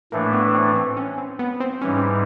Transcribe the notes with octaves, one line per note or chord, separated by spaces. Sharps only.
A2 E3 A3 A#3 D4
B3
C4
C4
C#4
C4
B3
C4
G#2 E3 G3 C#4